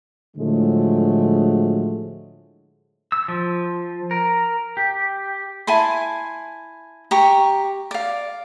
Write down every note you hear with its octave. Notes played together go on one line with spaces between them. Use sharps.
A2 D3 F3 F#3 G#3 A3
E6
F3
A#4
G4
E4 G#5 A5 C6
G4 A#5 C#6
D5 F5